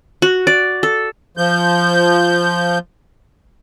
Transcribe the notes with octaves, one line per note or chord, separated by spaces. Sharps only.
F#4
D5
A4
F3 G6